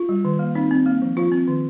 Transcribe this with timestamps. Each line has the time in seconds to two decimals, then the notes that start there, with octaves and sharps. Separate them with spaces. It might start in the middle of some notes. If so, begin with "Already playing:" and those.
Already playing: F4
0.09 G3
0.25 D#3
0.39 A#3
0.55 C4 D#4
0.71 C4
0.86 A#3
1.02 F3
1.17 F3 F4
1.32 C4
1.48 D#3